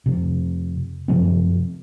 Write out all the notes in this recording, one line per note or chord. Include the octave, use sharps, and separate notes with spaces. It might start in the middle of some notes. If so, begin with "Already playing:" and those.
F2 C3
F#2 C3 F3 C4